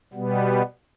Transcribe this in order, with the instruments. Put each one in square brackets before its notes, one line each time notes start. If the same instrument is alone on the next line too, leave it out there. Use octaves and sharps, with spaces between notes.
[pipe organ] B2 G3 B3